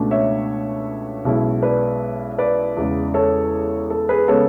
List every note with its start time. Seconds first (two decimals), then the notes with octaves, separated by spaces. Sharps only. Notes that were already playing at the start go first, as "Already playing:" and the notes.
Already playing: C#2 B2 A3 D4
0.11 C#5 E5
1.25 B1 B2 G#3 C#4 E4
1.63 B4 D5
2.38 B4 D5
2.77 E2 C#3 G#3
3.14 A4 C#5
3.90 A4
4.09 G#4 B4
4.28 C#3 G#3 B3 A4 C#5